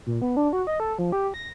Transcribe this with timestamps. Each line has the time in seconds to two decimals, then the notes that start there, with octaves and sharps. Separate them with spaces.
0.06 A#2
0.22 B3
0.37 D4
0.53 F#4
0.67 D#5
0.80 A4
0.98 F3
1.12 G4
1.34 A#6